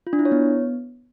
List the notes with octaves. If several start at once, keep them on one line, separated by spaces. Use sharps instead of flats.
F4
D4
E4
C#5
B3